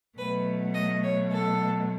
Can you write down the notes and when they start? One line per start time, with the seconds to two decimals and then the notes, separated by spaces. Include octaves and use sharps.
0.17 B2 F#3 A3 B4
0.74 D#5
1.03 C#5
1.31 A4